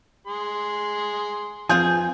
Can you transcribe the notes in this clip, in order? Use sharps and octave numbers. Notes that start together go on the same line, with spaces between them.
G#4 C6
B2 F3 C4 F4 G#4 G#5 G6